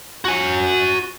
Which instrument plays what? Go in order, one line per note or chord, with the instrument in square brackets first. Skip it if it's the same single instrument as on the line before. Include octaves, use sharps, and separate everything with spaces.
[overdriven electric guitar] F#4 G#5